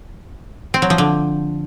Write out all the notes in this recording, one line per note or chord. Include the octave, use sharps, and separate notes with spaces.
C4
F#3
F3
D3